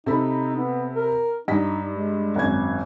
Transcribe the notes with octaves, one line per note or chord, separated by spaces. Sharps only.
C3 D#4 A4 B5
B3
A#4
G2 D#4 D#5 B6
G#3
G#1 F#2 G#6